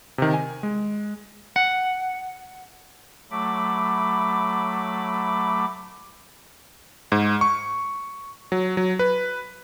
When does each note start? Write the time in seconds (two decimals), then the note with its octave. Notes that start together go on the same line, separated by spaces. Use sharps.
0.18 C3 D#3
0.33 G#5
0.63 G#3
1.56 F#5
3.31 F#3 A3 B5 D6
7.12 G#2
7.41 C#6
8.52 F#3
8.77 F#3
8.99 B4